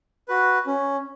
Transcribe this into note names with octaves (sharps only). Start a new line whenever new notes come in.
F#4 B4
C#4